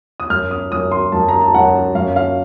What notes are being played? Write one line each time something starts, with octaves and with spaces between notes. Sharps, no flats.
D#6
F#2 F6
D#6
F#2 D#6
C6
F#2 A5
A#5
A5
F#2 F#5
F#2 F5
F5